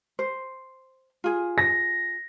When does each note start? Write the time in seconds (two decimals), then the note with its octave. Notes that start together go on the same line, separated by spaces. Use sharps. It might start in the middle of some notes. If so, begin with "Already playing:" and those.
0.19 C5
1.24 F4 G#4
1.58 A#6